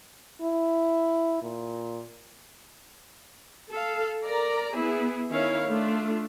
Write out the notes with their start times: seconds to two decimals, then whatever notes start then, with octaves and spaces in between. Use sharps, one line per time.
0.42 E4
1.42 A#2
3.71 A4 F5
4.24 A#4 D5 A#5
4.73 B3 E4 G#4
5.29 D#3 C#4 E4 C#5 F5
5.67 A3 D4 F4